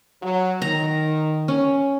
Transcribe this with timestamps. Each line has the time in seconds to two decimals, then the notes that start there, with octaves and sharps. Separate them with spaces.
0.23 F#3
0.62 D#3 A#5
1.48 C#4